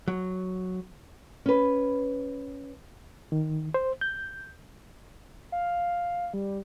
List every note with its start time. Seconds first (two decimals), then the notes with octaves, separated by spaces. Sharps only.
0.08 F#3
1.46 C#4 B4
3.32 D#3
3.74 C5
4.01 G6
5.52 F5
6.34 G3